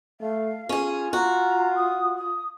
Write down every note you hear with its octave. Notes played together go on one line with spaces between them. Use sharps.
A3 F5
C#4 F4 G#4
F#4 A#5
D#6
D#6